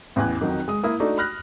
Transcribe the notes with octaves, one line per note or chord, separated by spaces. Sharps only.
A1 E2 E3 G#5 F#6
F2 D#3 F#3
G#3 D#6
A#3 E4 D#6
A3 D4 D#4 F#4 D5
B5 D#6 F6 F#6 A#6